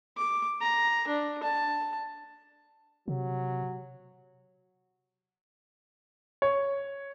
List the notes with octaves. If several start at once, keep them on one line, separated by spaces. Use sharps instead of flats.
D6
A#5
D4
A5
C3 F#3
C#5